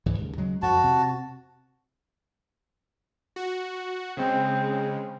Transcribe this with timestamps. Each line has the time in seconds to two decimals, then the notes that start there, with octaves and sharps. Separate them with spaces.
0.06 C#2 G#2 E3
0.19 D#2 C#3
0.38 C#3 F#3 G#3
0.62 F2 F#4 A5
0.83 C3
3.36 F#4
4.17 C#3 G#3 C4